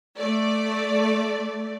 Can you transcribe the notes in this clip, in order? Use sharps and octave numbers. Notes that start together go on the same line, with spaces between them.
A3 D5